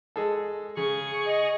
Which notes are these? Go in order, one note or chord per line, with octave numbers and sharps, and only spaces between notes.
G#3 G#4 A4
C#3 G#4 C#6
D#5